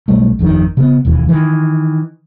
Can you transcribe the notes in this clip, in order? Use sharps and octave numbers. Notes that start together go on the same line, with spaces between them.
B1 G3 A3
G1 F2 B2 D#3
C#3 B3
E1 D#2 E3
D#3 E3